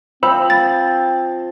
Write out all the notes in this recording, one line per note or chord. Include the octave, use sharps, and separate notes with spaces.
F3 C4 C5 B5 E6
A6